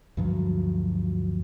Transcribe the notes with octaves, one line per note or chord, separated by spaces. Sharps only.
D2 G2 F3 F#3